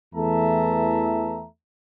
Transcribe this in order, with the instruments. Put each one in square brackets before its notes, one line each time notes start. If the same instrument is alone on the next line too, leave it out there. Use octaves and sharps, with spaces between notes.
[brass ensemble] E2 E3 A3 A4 E5 A#5